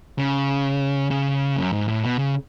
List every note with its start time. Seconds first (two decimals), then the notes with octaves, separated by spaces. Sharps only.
0.19 C#3
1.11 C#3
1.57 F#2
1.73 G#2
1.88 A2
2.04 B2
2.19 C#3